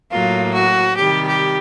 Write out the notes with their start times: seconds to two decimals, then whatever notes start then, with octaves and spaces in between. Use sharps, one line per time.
0.12 A2 F#3 A#3 F4
0.54 F#4
0.97 C3 D#3 G3 G4
1.26 G4